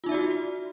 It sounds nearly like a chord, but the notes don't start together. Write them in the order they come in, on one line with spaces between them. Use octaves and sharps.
F4 D#4 E5 D5 F#4